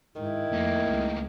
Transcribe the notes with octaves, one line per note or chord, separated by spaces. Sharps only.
G#2 D#3 E4
F2 A3 A#3
C#2